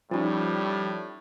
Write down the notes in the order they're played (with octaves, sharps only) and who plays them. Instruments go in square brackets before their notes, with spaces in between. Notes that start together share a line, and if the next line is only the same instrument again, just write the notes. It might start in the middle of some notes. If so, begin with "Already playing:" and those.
[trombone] A2 [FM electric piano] F3 [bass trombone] G3 [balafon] C#4 D#4